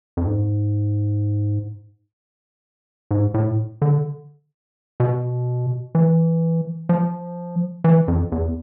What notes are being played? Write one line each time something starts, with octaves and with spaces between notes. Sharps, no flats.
F2
G#2
G#2
A2
D3
B2
E3
F3
E3
F2
E2